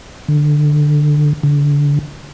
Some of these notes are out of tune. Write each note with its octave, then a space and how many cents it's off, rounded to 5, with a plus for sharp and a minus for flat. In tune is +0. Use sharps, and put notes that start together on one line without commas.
D3 +15
D3 -25